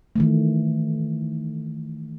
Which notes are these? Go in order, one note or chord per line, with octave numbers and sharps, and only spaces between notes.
D#3 E3 A3